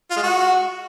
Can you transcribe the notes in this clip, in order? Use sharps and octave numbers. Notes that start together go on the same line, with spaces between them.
F4
G#3
F#4